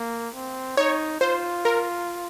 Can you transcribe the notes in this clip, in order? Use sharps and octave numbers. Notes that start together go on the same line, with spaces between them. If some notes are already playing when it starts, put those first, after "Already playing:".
Already playing: A#3
C4
D#4 C#5
F4 C5
A#4